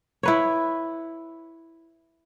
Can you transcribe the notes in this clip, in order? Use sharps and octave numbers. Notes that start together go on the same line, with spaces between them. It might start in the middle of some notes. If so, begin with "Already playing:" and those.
E4 B4 C#5